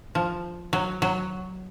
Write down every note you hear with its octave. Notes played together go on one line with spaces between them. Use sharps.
F3
F#3
F#3